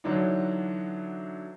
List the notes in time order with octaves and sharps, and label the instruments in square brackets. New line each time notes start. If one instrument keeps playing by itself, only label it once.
[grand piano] D3 E3 F#3 D4 D#4